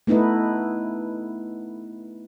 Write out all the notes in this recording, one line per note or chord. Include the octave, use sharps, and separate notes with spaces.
A3 B3 D#4 E4 B4